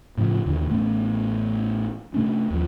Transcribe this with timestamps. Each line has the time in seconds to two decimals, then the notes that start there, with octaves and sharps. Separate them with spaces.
0.18 A2 C#3 E3 F3
0.46 D#2 A#2 D3
0.70 A1 A3 B3 C#4
2.14 C3 A3 C#4 D4
2.50 D#2 F3